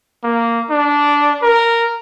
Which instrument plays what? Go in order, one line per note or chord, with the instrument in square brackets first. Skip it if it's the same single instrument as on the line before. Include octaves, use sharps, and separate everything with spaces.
[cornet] A#3
D4
A#4